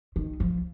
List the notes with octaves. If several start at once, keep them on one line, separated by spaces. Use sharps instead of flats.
D#3
F3